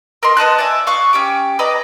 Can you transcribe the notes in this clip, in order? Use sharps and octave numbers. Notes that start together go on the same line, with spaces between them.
A#4 D#5 C6
B3 D#5 A5 F#6
D5 E5 G#5
F5 C#6 D#6 F#6
C#4 G4 D6
B4 D5 D#5 A#5